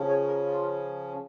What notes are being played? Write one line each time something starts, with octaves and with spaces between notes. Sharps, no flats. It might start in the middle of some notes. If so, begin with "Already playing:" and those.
Already playing: C#3 F3 C#4
C#5
A#4
F4